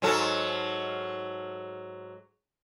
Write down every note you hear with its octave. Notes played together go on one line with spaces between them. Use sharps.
G#2 F#3 A4